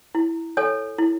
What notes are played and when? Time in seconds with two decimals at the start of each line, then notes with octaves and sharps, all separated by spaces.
0.15 E4
0.57 A4 C#5 G#5
0.98 E4